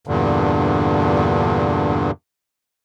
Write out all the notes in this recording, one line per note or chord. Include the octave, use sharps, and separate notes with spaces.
E2 G2 A#2 D3